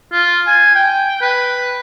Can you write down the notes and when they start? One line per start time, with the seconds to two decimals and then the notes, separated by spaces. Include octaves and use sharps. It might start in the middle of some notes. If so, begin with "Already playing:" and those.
0.12 F4
0.47 G#5
0.75 G5
1.21 B4